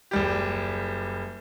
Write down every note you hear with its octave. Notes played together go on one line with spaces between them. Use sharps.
F#1 G3 G4